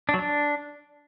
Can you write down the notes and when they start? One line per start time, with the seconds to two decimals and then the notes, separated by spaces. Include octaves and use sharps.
0.09 D4
0.14 F#3
0.19 D4